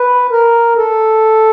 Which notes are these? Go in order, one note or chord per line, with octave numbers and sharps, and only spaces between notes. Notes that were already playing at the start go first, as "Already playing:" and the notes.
Already playing: B4
A#4
A4